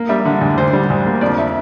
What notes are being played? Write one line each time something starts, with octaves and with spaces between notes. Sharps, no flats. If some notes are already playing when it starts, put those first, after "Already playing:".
Already playing: A#3
G3 E5
D3
D2
D2 C5
G3
D2
A#3
F2 D5
E5